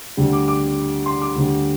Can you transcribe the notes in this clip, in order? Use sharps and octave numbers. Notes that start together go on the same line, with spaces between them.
D2 D3 G3
D6
D6
C6
D6
D2 D3 G3